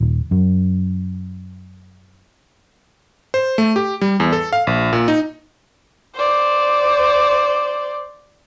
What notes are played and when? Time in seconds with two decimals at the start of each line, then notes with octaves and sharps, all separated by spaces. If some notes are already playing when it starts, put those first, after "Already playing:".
0.01 D#1
0.31 F#2
3.34 C5
3.58 A3
3.76 G4
4.01 G3
4.20 E2
4.33 A4
4.53 F5
4.67 A#1
4.93 A#2
5.08 D#4
6.15 C5 D5